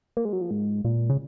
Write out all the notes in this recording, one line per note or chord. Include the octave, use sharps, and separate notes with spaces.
A#3
G#3
F#3
F3
G#2
A#2
C#3